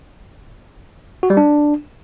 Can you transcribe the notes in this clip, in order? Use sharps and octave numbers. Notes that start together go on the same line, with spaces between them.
F#4
G3
D4